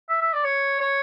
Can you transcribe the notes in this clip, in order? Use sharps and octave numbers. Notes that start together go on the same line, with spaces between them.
E5
E5
D5
C#5
C#5